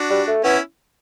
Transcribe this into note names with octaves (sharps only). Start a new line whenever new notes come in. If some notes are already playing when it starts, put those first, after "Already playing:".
Already playing: D4 F#4
G3
A3
B3 C#4 E4